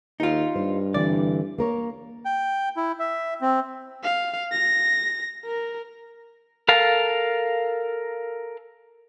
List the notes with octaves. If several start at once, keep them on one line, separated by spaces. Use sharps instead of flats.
D#2 D#4 F4
G2 C5
D3 E3 C4 D5
A#3 A#4 C#5
G5
E4
E5
C4
F5
A#6
A#4
A4 A#4 F5 A5